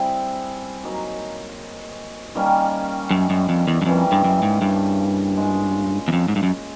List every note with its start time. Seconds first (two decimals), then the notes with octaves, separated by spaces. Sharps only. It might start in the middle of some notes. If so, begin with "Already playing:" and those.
Already playing: G3 C4 E4 G#4
0.84 F#3 A#3 D#4
2.35 D#3 G3 A#3 C#4
3.11 F#2
3.30 F#2
3.49 F2
3.68 E2
3.82 F#2
3.86 F2 C#3 E3 G3 A#3
4.12 G2
4.24 F#2
4.43 G#2
4.62 G2
5.37 G#3 C#4 F4
6.08 E2
6.13 F2
6.28 G#2
6.36 G2
6.43 F#2